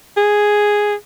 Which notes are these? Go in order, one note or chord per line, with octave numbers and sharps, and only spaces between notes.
G#4